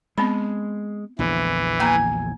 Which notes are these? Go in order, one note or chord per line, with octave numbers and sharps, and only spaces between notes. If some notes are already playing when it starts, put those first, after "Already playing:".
G#3 B3 C4 B5
A#1 E2 D3 E3
A#3 G#5 A#5